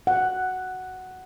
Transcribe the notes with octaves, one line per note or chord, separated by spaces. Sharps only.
F#5